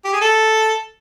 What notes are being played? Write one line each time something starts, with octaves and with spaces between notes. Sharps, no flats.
G4
G#4
A4